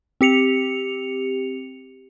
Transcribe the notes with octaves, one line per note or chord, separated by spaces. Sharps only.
C4 G4 C#7 F7